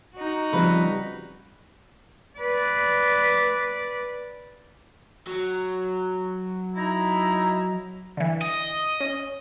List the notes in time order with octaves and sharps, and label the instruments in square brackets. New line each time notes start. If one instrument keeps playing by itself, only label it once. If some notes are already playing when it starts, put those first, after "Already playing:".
[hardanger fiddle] D#4 F#4
[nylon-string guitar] C#3 F3 C4 [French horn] G3 [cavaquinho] B4
[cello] B4 D5
[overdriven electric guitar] F#3
[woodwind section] D#4 E4 A#5
[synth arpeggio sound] D3 E3
[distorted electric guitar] D#5
[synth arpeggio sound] C#4